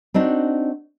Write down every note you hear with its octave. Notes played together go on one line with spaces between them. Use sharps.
C4 D4 D#4 F#4